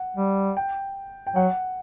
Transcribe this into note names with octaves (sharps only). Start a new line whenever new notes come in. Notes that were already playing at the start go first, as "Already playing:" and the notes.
Already playing: F#5
G3
G5
G5
F#3 F#5